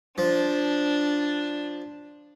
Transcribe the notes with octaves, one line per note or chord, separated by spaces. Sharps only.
F3 D4